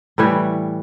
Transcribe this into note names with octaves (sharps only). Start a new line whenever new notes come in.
A2 E3 G3 B4 C#5